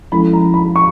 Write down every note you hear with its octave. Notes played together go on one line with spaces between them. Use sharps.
F3 G#3 C#4 E4 A4 B5
A#5
B5
C#6